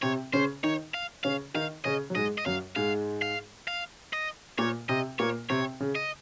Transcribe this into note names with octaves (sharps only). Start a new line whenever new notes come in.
C3 C4 C#5
C#3 C#4 C5
D#3 D#4 C#5
F5
C#3 C#4 F5
D#3 D#4 F5
C#3 C#4 D#5
F#3
G#2 G#3 D#5
D#5
F#2 F#3 F5
G#2 G#3 F5
F5
F5
D#5
A#2 A#3 C#5
C3 C4 D#5
A#2 A#3 C#5
C3 C4 C#5
C#3
D#5